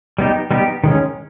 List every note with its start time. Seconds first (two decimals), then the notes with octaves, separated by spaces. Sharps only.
0.18 G3 B3 D#4 G4
0.51 G3 B3 D#4 G4
0.84 D#3 G#3 C#4